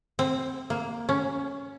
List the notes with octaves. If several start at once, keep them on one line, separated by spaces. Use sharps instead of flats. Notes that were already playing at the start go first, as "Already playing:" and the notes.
C4
A#3
C#4